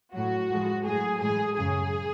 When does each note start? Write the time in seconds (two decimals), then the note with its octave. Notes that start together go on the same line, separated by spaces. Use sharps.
0.13 A2 F#3 F#4
0.49 A2 F3 G#3
0.84 A2 F#3 G#4
1.20 A2 E3 G#3 G#4
1.55 F#2 C#3 F#3 G#4